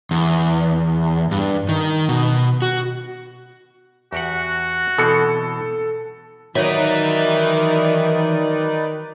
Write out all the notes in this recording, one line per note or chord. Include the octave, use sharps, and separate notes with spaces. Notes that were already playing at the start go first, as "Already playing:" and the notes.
E2
G2
D#3
B2
F#4
E2 F#4 G4 F#5
B2 E3 C4 A4 C#7
D#3 E3 F#3 D#4 B4 D5 E5